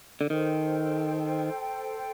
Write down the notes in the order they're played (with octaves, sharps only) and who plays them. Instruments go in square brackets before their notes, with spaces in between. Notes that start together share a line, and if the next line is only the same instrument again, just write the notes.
[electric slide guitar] D3
[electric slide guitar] D#3 [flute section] A4 C5 G5